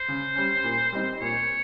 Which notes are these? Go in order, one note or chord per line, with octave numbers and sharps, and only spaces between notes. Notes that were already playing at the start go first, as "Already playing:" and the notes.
Already playing: C5
C#3
G3 C#4
A#2
G3 C4 D#4
A#2 C#5